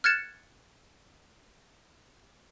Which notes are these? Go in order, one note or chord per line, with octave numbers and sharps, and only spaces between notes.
F6 F#6 G#6 A6 C#7 E7